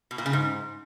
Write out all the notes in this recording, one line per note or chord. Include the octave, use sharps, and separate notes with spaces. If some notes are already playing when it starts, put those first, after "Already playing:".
B2
A#2
C#3
G#2